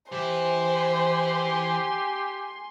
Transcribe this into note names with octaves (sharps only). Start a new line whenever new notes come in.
E3 G4 C5 E5 G#5 C6